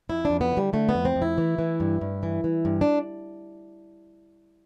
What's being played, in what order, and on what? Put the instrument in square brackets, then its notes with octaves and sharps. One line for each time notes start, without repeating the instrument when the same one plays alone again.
[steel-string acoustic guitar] F2 E4
D4
F2
B3
D3
G3
D3 A3
B3
F2
C4
F2
E4
E3
E3
G2
G2
E3
E3
G2
D4